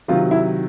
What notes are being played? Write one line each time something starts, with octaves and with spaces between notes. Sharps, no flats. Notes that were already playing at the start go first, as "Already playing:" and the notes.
C3 D#3 F#3 F4
E4